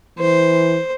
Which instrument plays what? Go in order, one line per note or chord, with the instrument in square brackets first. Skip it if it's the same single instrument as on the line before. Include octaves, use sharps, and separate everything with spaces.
[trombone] E3 [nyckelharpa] C5